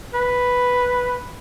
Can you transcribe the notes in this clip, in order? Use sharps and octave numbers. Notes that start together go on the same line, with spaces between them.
B4